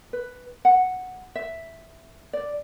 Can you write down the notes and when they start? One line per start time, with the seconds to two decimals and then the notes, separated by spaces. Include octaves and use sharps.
0.13 B4
0.65 F#5
1.35 E5
2.33 D5